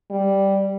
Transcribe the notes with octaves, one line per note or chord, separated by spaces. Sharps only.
G3